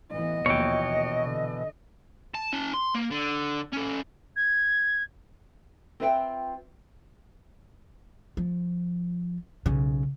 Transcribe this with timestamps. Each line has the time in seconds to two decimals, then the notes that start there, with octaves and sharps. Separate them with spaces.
0.12 A1 E3 B3 D#5
0.46 A#1 D#2 B2 E3 C#5 G5
1.24 D3
2.35 A5
2.53 C#4 A5
2.74 C6
2.94 A#3
3.11 D3
3.73 C#4 A4
4.36 G#6
6.00 C4 F4 B4 E5 F5 G5
8.37 F3
9.66 B1 C#3